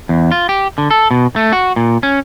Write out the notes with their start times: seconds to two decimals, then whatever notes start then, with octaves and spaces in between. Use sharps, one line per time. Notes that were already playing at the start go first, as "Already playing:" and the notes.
0.09 E2
0.32 F4
0.49 G4
0.78 D3
0.91 A4
1.11 B2
1.36 A3
1.53 F#4
1.76 A#2
2.03 C#4